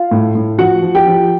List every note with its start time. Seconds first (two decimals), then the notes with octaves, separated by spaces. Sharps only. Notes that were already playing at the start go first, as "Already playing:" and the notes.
Already playing: F4 F5
0.11 A2
0.35 A2
0.59 F3 F#4 F#5
0.82 F3
0.95 G4 G5
1.06 F3